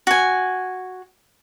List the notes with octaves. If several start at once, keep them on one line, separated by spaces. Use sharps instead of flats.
F#4 G#5